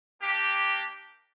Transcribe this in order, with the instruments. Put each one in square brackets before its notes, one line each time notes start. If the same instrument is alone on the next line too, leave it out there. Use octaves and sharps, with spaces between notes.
[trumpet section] A#3 D4 G4